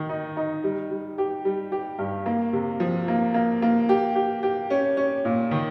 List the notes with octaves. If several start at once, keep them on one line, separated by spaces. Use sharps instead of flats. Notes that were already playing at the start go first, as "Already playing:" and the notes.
Already playing: D#3
D#4
D#4
G3
G3
G4
G3
G4
G2
A#3
C3
F3
A#3
A#3
A#3
G4
G4
G4
C#4
C#4
A#2
D#3